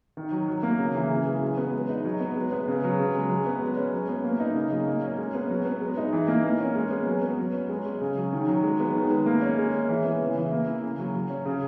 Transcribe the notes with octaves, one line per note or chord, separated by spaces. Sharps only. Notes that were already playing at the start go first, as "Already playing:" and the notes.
D#3
F#3
F#3
A#3
C#3
E3
C#3
G#3
F#3
B3
G#3
D#4
F#3
B3
G#3
B3
C#3
F#3
C#3
G#3
F#3
B3
G#3
C#4
F#3
B3
A#3
D#4
C#3
F#3
A#3
C#4
G#3
B3
F#3
B3
G#3
D#4
E3
A#3
A#3
C#4
G#3
B3
F#3
B3
F#3
C#4
G#3
C#4
C#3
F#3
D#3
F#3
G#3
B3
D#3
G#3
A#3
C#4
G#3
C#4
E3
B3
C#3
E3
A#3
E4
C#3
F#3
F#3
C#4
C#3